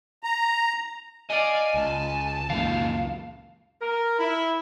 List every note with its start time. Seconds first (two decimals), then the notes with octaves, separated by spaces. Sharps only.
0.23 A#5
1.30 D5 D#5 F5 G#5
1.74 C#2 A5
2.50 C#2 F#2 A#2 E3 D#4 F5
3.81 A#4
4.19 E4